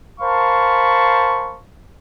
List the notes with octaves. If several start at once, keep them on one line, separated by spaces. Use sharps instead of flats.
A#4 C5 F5 A5 B5 C#6